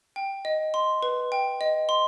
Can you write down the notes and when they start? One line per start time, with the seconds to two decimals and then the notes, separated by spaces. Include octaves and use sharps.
0.16 G5
0.45 D#5
0.74 C6
1.03 B4
1.32 G5
1.61 D#5
1.89 C6